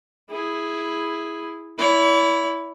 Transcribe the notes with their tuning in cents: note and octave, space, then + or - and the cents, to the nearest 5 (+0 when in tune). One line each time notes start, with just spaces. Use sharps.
E4 +0 G#4 +0
E4 +0 C#5 +45